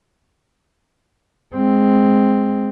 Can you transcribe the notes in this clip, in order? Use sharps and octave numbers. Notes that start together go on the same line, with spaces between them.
G#3 C4